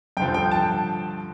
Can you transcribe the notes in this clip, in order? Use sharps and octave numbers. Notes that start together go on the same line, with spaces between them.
G2 D3 F3 G5
G5
A5